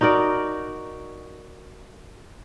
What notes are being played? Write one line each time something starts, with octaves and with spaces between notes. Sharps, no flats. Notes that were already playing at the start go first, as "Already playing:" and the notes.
D#4 F#4 A#4 D5